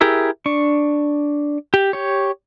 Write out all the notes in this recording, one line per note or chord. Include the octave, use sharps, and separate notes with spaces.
E4 G4 G#4 A#4 E5
D4 C#6
G4
G4 C#5